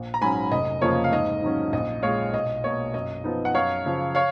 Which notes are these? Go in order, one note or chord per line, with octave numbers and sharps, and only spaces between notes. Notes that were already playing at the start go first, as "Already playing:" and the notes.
Already playing: A#1
A#5
G#2 F#3 C#4 G#5 B5
F1 D#5
F2 C#3 F3 A#3 C#5
F5
G#2 D#5
D#3 F#3 C#4
A#1 D#5
A#2 G#3 C#5 F5
B1 D#5
B2 A#3 C#5
F#2 D#5
F3 B3 D#4
F#5
F#2 C#5 F5
C#3 F3
C#5 F5